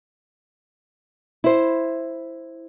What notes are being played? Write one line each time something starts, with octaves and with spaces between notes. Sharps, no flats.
E4 C5